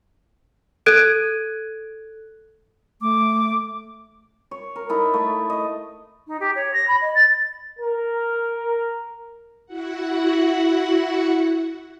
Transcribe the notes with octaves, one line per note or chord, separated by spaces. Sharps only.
A4 F#6 G#6 D7 D#7
A3 D6
C#5
A#4
D#4 E4 A4
A3
D#5
D#4
G4
C#5
A#6
B5
D#5
A6
A#4
E4 F#4 F#5